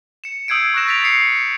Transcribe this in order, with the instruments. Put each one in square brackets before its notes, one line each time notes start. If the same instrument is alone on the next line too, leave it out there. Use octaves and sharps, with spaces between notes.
[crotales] C#7 E7
D#6 E6 G6 G#6 C7 D7
C#6 E6 F#6 A#6 E7
A6 B6 D7 F7
D#6 C7 C#7 F7